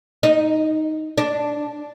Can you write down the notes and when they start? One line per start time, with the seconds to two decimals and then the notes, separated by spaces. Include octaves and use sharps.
0.23 D#4
1.18 D4